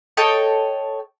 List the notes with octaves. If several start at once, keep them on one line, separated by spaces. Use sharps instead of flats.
A4 C#5 D#5 G5